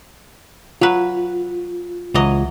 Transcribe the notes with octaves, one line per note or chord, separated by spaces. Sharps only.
F#3 F4 B4
C#2 E3 F#3 D#5